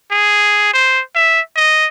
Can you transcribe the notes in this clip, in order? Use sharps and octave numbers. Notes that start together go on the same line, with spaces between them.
G#4
C5
E5
D#5